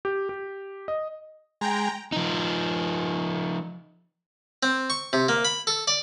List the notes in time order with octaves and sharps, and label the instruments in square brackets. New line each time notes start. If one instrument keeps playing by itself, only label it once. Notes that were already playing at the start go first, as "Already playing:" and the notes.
[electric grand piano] G4
G4
D#5
[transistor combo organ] G#3 [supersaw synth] G5 A#5
[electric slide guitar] F3 D#4
[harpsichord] C4
C#6
C3
A#3
B5
A4
D5